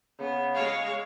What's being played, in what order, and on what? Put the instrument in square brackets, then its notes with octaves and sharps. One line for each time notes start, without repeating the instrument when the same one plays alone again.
[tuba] C#3 [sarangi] B3
[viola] G#3 C#5 [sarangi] F5